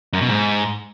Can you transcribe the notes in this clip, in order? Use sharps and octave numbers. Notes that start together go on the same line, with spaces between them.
F#2
B2
G#2